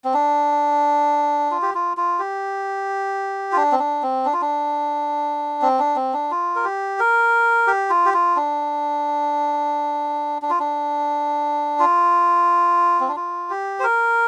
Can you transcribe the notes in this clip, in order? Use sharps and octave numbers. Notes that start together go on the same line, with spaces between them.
C4
D4
F4
G4
F4
F4
G4
F4
D4
C4
D4
C4
D4
F4
D4
C4
D4
C4
D4
F4
A#4
G4
A#4
G4
F4
G4
F4
D4
D4
F4
D4
F4
C4
D4
F4
G4
C5
A#4